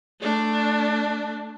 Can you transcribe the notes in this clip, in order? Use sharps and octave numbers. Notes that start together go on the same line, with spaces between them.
A3 D4